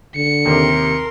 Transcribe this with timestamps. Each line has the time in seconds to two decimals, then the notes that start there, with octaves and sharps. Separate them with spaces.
0.16 D3 C#7
0.46 D#2 C3 A#4 C6